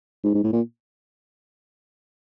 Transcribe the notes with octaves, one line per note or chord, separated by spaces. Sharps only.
G#2
G#2
A2
A#2